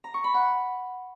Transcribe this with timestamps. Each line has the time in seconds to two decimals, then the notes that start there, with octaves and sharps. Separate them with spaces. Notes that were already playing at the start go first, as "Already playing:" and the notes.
0.04 A#5
0.14 C#6
0.24 B5
0.34 F#5